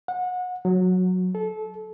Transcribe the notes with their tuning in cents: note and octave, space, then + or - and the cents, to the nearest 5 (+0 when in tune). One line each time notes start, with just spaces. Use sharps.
F#5 -30
F#3 -10
A4 -25